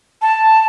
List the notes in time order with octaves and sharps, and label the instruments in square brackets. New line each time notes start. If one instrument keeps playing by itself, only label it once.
[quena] A5